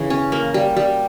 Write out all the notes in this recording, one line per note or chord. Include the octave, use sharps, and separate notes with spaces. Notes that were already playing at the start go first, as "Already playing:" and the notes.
Already playing: C#3 E3
C#4
A#3
G3
G3